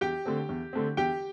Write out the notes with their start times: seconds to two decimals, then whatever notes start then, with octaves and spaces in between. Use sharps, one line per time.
0.01 E2 G4 G5
0.25 D3 A3 C4
0.49 E2
0.73 D3 A3 C4
0.97 E2 G4 G5